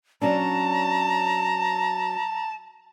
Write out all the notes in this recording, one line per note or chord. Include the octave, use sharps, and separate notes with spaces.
F#3 C#4 D4 A5 A#5